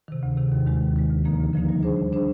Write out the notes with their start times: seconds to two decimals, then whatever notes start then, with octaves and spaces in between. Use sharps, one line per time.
0.08 C3 D#3
0.23 D2
0.37 C3 D#3
0.52 D#2
0.67 D#3 G#3
0.81 D#2
0.96 D#3 G#3
1.10 D2
1.24 D3 F3 A#3 D#4
1.40 D2
1.54 D3 F3 A#3 D#4
1.69 G3
1.83 D4 G#4 C5
1.97 G3
2.13 D4 G#4 C5